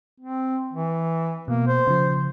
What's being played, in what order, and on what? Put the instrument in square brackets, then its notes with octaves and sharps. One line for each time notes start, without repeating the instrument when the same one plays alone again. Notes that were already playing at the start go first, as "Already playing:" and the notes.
[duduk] C4
E3
[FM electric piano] B2 [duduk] A#3
[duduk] C5
[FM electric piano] C#3 F3